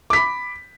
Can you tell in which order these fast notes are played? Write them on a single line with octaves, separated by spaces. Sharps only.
D6 B6 B5